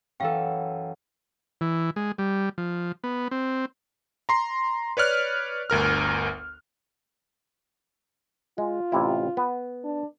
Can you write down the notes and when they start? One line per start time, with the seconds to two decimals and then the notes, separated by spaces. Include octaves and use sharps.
0.20 F#2 E3 A4 F5 G5
1.61 E3
1.96 G#3
2.18 G3
2.58 F3
3.04 B3
3.31 C4
4.29 A#5 C6 C7
4.97 B4 C#5 D5 F6 F#6
5.70 G1 D2 A#4 F6
8.58 G#3 F4
8.92 A1 C3 E4
9.37 B3
9.84 D4